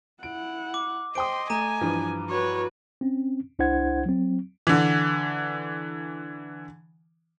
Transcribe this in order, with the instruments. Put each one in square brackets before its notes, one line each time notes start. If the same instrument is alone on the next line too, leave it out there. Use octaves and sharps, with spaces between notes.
[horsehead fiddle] E4 F#5 [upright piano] D7
[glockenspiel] D6
[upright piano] C5 G5 D#6 [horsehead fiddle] D#5 [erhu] C6 [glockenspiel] D7
[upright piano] A3 [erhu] G#5 [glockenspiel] A#5 D#7
[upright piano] G2 E3 F3
[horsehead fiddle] F#4 B4 [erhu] C#5
[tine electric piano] C4 C#4
C2 D4 E4 C5 F#5 G#6
F#3 C4
[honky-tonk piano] D3 E3